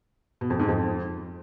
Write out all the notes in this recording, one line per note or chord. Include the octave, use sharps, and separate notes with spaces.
B2
F2
G#2
F2